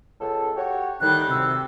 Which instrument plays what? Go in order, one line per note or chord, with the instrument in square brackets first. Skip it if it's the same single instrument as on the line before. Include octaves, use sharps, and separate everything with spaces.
[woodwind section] C#2 A4
F#4 G4 C#5
[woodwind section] A2 [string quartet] D#3 G3 [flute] F#6
[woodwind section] D2 [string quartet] C3 [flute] E6